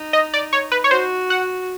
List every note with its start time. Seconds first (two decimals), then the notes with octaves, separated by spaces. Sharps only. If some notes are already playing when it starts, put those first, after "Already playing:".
Already playing: D#4
0.13 D#5
0.34 D5
0.53 C#5
0.72 B4
0.84 C#5
0.91 F#4 C5
1.30 F#5